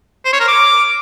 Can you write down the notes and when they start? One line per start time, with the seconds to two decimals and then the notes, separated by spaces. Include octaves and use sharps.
0.25 C5
0.33 C#5
0.40 A#4
0.48 D6